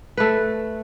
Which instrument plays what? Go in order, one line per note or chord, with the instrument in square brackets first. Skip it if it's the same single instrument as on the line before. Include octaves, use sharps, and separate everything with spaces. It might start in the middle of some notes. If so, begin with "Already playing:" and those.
[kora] A3 B4